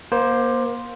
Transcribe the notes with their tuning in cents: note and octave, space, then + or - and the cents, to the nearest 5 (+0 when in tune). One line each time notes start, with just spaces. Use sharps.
A#3 +30 C5 +0